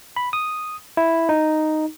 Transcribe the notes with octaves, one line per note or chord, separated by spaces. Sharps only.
B5
D#6
E4
D#4